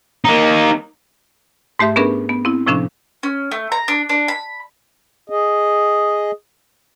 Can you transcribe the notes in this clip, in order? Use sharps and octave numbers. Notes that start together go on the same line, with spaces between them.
A#3 D#4
G#2 A3 G4 E5 C6
B3 C#4 D4 G#4 A#4 B4
B3
C4 E4
A2 C3 F3 C#4 D4
C#4
A3
A#5
D4
D4
B5
G#4 D#5